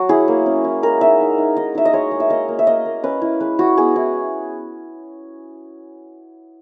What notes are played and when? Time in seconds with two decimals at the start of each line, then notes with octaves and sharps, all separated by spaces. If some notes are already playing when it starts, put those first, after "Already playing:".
Already playing: F#3 F#4
0.09 E4 G#4
0.28 A#3
0.46 C#4
0.64 E4
0.83 G#3 A#4
1.01 D#4 E5
1.20 D#4
1.38 D#4
1.56 D#4 D#5
1.75 D#4 E5
1.85 D#5
1.93 G#3 C#5
2.11 G#3
2.20 E5
2.30 A#3 D#5
2.49 A#3
2.59 E5
2.67 A#3 D#5
2.85 A#3
3.03 C#4 B4
3.22 E4
3.40 G#3 B4
3.59 E4 F#4
3.77 B3 G#4
3.96 E4